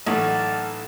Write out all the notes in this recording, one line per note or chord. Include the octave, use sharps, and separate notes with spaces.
B1 A2 E3 D5 F5 F#5 A5